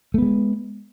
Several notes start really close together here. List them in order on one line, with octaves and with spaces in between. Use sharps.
A3 B3 G#3